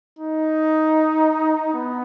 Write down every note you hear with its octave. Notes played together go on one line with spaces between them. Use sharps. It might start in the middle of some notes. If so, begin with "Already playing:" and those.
D#4
B3